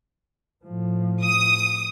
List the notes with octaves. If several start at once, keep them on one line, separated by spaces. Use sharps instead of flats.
A2 F3
D#6